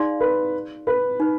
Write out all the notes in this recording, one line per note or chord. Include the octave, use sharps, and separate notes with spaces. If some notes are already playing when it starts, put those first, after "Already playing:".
Already playing: D#4 G#4 D5 F5 C6
B4
B4
D#4 B4